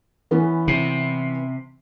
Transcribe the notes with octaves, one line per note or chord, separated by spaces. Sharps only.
E3 B3 C#4
C3